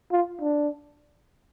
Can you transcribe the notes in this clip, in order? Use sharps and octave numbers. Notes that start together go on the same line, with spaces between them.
F4
D4